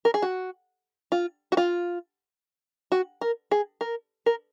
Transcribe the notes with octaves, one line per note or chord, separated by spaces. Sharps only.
A#4
G#4
F#4
F4
F#4
F4
F#4
A#4
G#4
A#4
A#4